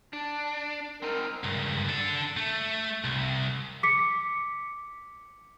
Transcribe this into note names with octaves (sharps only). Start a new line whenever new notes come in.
D4
C4 D#4 A#4
C#2 G2
D4 A4
A3
C2
D6 B6 C#7